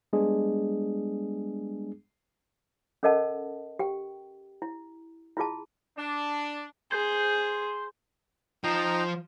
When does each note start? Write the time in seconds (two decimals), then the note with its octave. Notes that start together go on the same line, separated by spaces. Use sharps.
0.13 G3 G#3 B3 D4 G#4
3.03 C#4 A4 A#4 D#5 F#5 A5
3.79 G4 G5
4.62 E4
5.37 E4 F4 G#4 A5
5.97 D4
6.92 G#4 C5
8.64 F3 D#4 G5 A#5